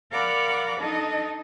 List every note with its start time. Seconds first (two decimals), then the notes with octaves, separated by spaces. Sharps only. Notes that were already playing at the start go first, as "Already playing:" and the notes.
0.10 A#4 D5 F5 F#5 B5 D6
0.80 D4 D#4 A4 D#5